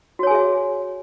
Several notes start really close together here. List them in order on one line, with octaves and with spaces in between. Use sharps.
F#4 C#5 G#5 G#4 E5